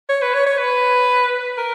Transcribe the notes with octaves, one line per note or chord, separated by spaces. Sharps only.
C#5
B4
C#5
C#5
B4
A#4